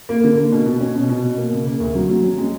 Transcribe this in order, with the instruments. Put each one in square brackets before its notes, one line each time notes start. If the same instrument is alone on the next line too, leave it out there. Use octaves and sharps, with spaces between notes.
[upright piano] A#3
D3
A#3
B2
B2
C#4
B2
B2
B2
A#3
C#3
A#3
D2
F#3
F#3
C#4
G#3